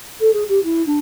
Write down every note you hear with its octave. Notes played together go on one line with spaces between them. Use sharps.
A4
G#4
G4
E4
D4